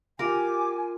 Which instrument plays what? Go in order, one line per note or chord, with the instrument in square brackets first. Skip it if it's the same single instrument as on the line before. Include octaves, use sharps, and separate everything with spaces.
[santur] F4 [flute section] G4 D6 [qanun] A#4 [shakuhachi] G#5